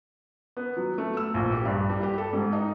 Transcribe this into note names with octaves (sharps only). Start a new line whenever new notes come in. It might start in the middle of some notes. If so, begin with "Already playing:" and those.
B3
F#3
A3
E6
A#1
G4
G2
G3
G4
A4
G#2
D#4